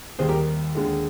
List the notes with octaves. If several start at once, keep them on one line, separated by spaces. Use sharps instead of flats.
D#2 D#3 G3 G#4 C5
G4 A#4
D#2 D3 G#3